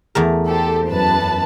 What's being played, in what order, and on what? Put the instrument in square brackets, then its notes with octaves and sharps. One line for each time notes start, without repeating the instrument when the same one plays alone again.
[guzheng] E2 A3 A#4
[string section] G4 A4 C5
F#2 B4 A5